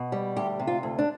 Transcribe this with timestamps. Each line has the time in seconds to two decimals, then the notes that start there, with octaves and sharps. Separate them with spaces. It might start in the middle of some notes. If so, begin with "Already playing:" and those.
Already playing: B2
0.12 G3
0.36 D2 G4
0.60 C3
0.67 F4
0.83 D2
0.99 D4